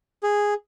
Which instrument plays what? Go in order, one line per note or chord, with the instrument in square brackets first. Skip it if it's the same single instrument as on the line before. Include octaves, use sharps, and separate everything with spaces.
[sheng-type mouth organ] G#4